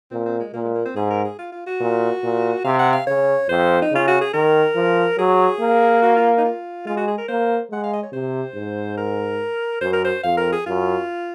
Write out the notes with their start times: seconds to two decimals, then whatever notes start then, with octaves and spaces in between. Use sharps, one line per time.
0.11 A#2 C4
0.26 C4
0.39 G#3
0.54 A#2 A#3
0.65 G#3
0.75 A#3
0.85 C4
0.96 G#2 G#4
1.10 A#4
1.25 G#4
1.38 F4
1.52 F4
1.67 F#4
1.80 A#2
2.23 A#2
2.65 C3 F5
2.79 F#5
2.93 F5
3.07 C#3 C#5
3.49 F2 C5
3.82 D#4
3.92 C#3 F4
4.07 F#4
4.21 G#4
4.33 D#3 A#4
4.75 F3
5.17 F#3 G#4
5.60 A#3
6.02 F#4
6.16 F4
6.37 D#4
6.44 F4
6.86 G#3 F4
6.97 F#4
7.08 G#4
7.18 A#4
7.28 A#3 C5
7.71 G#3 F#5
7.84 F5
7.93 D#5
8.03 C#5
8.12 C3 C5
8.55 G#2
8.98 A#4
9.81 F#2 C5
9.93 A#4
10.04 C5
10.23 F2 F5
10.37 A#4
10.52 G#4
10.66 F#2 F4